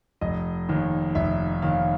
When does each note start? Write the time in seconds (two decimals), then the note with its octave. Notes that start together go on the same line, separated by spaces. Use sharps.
0.21 F1 D#5
0.69 D#2 D#3
1.15 F1 E5
1.62 D#2 D#3 F5